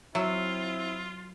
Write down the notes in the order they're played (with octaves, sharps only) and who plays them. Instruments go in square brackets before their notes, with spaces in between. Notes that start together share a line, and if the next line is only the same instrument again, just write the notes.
[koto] F#3 [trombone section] C4 E4 [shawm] F4 [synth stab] E5